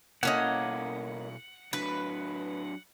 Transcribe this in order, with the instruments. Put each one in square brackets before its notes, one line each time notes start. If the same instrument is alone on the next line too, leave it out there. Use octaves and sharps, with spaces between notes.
[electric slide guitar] B2 E4 A4 [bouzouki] A#3 C#4 D#5 [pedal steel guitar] F#5
[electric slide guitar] F#3 D4 [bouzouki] B4